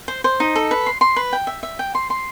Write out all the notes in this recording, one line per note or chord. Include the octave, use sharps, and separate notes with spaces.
C5
C5
D#4
A4
B4
C6
C6
B4
G5
E5
E5
G5
C6
C6